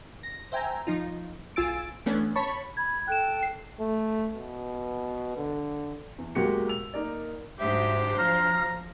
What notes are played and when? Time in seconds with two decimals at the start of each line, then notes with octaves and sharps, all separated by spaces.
0.23 A#6
0.52 C5 E5 G5 G#5 A#5
0.87 F3 D#4 F4
1.56 B1 F4 G#5 E6 A6 D7
2.06 E3 A3 B3 C#4 D4
2.36 C#5 A5 B5 C#6
2.77 B5 G#6
3.08 A4 G5 F#6 E7
3.43 C7
3.80 A3
4.35 B2
5.37 D3
6.18 E2
6.35 B1 G#3 A#3 F#4 G4 C#7
6.68 E6 F7
6.94 A#3 D#4 A#4 D5
7.59 G#2 F#3 D4 G4 C5 E5
8.18 F3 A#5 F6